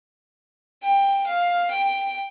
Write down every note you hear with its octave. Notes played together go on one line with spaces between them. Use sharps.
G5
F5
G5